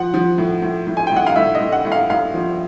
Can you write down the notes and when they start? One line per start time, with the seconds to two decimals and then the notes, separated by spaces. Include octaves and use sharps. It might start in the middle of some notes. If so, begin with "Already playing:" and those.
Already playing: F3 F#5
0.14 F3
0.38 A2
0.62 A2
0.87 A2
0.97 G#5
1.07 G5
1.12 A2 F#5
1.26 F5
1.36 A2 E5
1.55 D#5
1.60 A2
1.72 F#5
1.85 A2
1.92 F5
2.10 A2 F5
2.34 F3